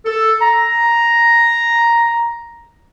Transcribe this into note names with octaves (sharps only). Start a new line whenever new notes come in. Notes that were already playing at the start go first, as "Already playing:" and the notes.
A4
A#5